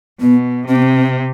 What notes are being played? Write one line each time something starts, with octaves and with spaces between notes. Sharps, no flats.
B2 B3
C3 C4
B3
C4